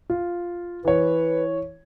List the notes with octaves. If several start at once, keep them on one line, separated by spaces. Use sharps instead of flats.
F4
E3 B4 C#5